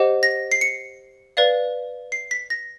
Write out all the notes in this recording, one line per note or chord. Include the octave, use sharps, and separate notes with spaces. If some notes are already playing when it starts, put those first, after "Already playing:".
Already playing: G4 C5 D#5 F#5
A#6
C7
C#7
B4 D5 F5
C7
B6
A#6